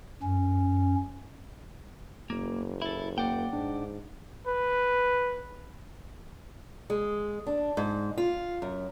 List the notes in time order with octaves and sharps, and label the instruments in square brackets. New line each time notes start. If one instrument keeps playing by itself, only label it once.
[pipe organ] F#2 C#4
[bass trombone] F#1 [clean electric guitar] A#3
[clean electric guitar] E4 A4
[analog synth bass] A#3 [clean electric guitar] D5 F#5 G5
[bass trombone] G#2 [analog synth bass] D4
[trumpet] B4
[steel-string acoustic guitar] G#3
D4
G#2
F4
F#2